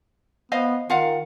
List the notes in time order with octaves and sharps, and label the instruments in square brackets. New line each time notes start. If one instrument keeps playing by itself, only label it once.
[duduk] B3 [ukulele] C5 D#5 F5
[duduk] D#3 [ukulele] F4 F5 F#5